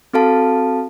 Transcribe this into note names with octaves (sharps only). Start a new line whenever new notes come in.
C4 F#4 A4 F5 A5